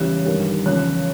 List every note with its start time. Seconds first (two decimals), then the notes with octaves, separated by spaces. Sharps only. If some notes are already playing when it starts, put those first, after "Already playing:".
Already playing: E2 C#3 E3 G3 F#6
0.25 G2 D#3 G3
0.66 E2 C#3 F3 F#6